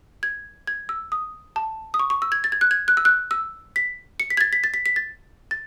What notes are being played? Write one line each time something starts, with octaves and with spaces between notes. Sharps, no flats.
G#6
G#6
E6
D#6
A5
D#6
C#6
C#6
E6
G#6
A6
G#6
F#6
G#6
F#6
E6
F#6
E6
B6
C#7
B6
G#6
A6
B6
A6
B6
B6
A6
A6